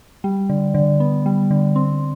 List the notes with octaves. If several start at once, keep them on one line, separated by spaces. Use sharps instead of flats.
G3
D3
D3
B3
G3
D3
C4